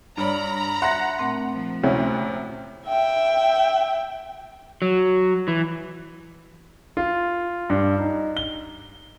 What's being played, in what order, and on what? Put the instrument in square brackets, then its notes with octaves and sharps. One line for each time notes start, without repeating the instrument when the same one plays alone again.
[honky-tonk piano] G2 [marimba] D4 C#5 D5 [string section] A#5 B5
[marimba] E5 [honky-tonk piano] F#5 A#6 [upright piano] C6
[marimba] A#2 A3 C4
[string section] F3
[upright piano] D2 C#4 E4 [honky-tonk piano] C3
[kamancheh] E5 G5
[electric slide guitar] F#3
E3
[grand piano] F4
G2
D#4
G7